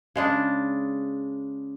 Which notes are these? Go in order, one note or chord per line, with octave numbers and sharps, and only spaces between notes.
C#3 G#3 D4